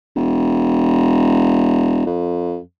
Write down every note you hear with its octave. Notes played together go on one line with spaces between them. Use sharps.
E1
F2